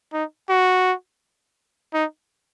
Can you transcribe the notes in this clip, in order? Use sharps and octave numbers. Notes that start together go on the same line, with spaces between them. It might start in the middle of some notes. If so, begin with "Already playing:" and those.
D#4
F#4
D#4